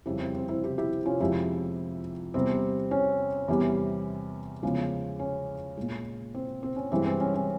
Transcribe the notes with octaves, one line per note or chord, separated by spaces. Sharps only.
F2 C#3 G3 E4 G4
C4 E4
C4
C4 E4
E4 G4
E4 G4
C#4 F4
F2 C3 F3 G#3 E4 G4
E2 C3 G3 C4
C#4
E2 C3 E3 G3
E2 C#3 F3 G#3
C#4
A#2 G#3
C4
C4
C#4
G2 E3 G#3 C4
C4
C#4
C#4